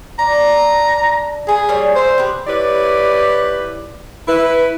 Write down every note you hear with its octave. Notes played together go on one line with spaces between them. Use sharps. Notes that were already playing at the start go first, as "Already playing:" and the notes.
D4 A#5
B3 G#4
G3 A#3 C#5
A#4 C5 E5
G4 G#4 B4
E4 G4 B4 C#5 D5
E4 B4